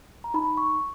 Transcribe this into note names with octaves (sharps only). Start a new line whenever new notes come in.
A#5
D#4 B5
C#6